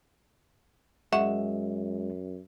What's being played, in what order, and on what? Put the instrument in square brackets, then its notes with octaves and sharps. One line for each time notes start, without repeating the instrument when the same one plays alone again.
[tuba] F#2 [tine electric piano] G#3 [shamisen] F#4 [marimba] E5